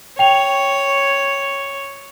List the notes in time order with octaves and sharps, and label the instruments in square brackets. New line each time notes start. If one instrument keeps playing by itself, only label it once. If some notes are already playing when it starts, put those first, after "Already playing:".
[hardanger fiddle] C#5 [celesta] G5 F7